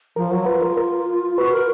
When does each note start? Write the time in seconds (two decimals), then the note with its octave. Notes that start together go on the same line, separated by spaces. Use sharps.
0.16 F3 A#4
0.31 F#3
0.46 F4 B4
0.62 A#4
0.77 A#4
1.38 F#4 B4
1.52 A#4